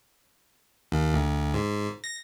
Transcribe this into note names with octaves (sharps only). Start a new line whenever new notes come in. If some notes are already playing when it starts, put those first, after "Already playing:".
D#2
D2
G#2
A#6